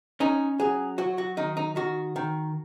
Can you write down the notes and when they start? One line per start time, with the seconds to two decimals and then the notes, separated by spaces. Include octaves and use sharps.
0.20 C#4 D#4
0.60 F#3 G#4
0.98 F#3 F#4
1.18 F#4
1.37 D#3 D#4
1.57 D#4
1.76 D#3 F#4
2.16 D#3